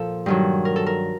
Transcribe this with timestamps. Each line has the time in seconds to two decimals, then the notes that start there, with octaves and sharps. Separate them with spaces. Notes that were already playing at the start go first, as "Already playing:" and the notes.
Already playing: A#2 F3 A4
0.26 G2 D#3 F#3
0.65 A#4
0.76 A4
0.86 A#4